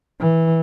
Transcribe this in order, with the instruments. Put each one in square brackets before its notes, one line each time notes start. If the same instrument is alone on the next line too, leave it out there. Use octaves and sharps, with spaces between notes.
[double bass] E3